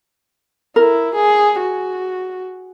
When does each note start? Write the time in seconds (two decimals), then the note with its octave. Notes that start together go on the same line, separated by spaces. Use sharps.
0.76 E4 A#4
1.15 G#4
1.59 F#4